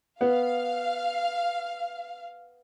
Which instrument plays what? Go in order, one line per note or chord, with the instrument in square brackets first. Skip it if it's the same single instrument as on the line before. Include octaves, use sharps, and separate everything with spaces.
[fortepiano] B3 [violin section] F5